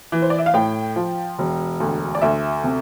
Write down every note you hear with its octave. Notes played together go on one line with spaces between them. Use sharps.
E3
C5
D5
E5
F5
A2 G5
F3
E1
D2
D5
D2 E5
C3